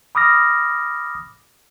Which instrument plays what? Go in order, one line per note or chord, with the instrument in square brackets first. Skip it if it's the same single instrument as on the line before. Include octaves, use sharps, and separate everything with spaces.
[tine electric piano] B5 D6 D#6 F6 A#6